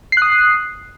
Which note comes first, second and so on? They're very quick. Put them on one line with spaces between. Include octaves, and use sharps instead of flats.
C7 F#6 D#6